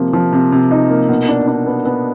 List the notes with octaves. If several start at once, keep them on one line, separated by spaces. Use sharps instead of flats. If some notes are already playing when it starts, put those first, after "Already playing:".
Already playing: C3 F3 A#3
F3
C3
C3
D#4
A#3
B2
D4
D4
B3
B3